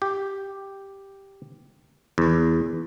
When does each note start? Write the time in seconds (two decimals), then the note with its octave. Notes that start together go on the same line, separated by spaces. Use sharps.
0.02 G4
2.18 E2